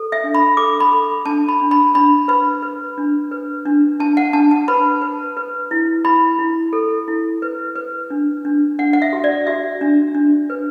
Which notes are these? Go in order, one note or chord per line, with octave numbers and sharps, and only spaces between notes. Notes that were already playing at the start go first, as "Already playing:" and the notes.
Already playing: A4
E5
D4
B5
A4 D6
B5
A4
D4 A5
B5
D4
B5
D4 B5
B4 B5
B4
D4
B4
D4
D4 A5
F#5
D4 A5
A5
B4 B5
B4
B4
E4
E4 B5
E4
A4
E4
B4
B4
D4
D4
D4 F#5
F#5
E5
F#4
D5
F#4 E5
D4
D4
B4